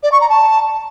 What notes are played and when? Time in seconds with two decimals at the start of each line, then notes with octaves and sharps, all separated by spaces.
0.03 D5
0.12 C#6
0.21 A#5
0.29 A5